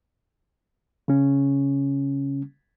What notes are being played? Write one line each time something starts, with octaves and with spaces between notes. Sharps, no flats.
C#3 C#4